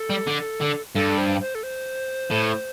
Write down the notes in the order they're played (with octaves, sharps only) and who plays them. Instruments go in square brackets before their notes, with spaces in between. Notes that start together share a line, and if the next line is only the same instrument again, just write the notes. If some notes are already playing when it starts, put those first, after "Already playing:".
Already playing: [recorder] A4
[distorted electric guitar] G3
D3
D3
[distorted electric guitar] G2 [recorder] A4
[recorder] C5
C5
A4
C5
[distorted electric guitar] A2